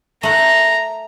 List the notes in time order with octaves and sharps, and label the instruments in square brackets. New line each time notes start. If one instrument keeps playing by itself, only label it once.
[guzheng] A3 F#5 [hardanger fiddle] A#5